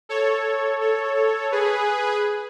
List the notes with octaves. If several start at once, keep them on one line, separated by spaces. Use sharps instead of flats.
A4 C#5
A4 C#5
G#4 B4